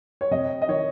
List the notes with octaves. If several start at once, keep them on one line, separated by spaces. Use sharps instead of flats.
C#5
C3 D#5
D#5
D#3 C#5